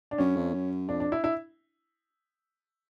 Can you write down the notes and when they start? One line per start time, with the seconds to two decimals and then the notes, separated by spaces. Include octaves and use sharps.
0.11 D4
0.18 F#2 C#4
0.36 F2
0.54 F#2
0.89 F2 D4
1.00 D4
1.12 E4
1.24 E4